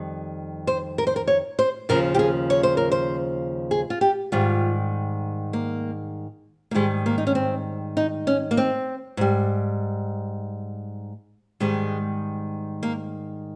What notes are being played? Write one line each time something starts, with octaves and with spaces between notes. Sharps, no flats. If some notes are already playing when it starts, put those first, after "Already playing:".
Already playing: F2 D#3 G3
C5
A#4
C5
A#4
C#5
C5
D#2 C#3 F3 A#4
G4
G#4
C#5
C5
A#4
C5
G#4
F4
G4
G#2 D#3 G3 F4
A#3
A#3
G#2 D#3 G3 G#3
A#3
D#4
C#4
C4
D#4
C#4
A#3
C4
G#2 G3
G#2 D#3 G3 G#3
A#3